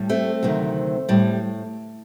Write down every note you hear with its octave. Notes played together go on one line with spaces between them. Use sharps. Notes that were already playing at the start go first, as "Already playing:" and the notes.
Already playing: A2 G3
A3 C4
D2 C3 D#3 F#3
A2 G3